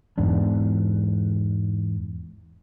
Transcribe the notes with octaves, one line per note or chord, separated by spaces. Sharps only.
E2 G#2 D4